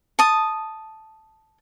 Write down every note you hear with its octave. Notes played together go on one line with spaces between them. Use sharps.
A5 D#6